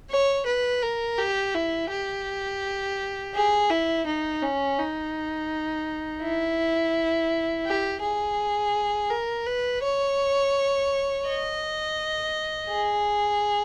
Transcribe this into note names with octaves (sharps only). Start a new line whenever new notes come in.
C#5
B4
A#4
G4
E4
G4
G#4
E4
D#4
C#4
D#4
E4
G4
G#4
A#4
B4
C#5
D#5
G#4